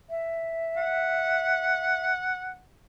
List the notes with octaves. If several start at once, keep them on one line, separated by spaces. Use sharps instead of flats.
E5
F#5